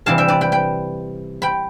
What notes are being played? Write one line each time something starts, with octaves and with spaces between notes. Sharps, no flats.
C3 E3 G3 F5 A5
E5 G5
B4 D5
G5 B5
G5 B5
G5 B5